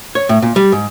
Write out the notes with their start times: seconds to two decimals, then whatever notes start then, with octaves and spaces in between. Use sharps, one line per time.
0.15 C#5
0.29 A2
0.42 A#2
0.56 G3
0.72 G#2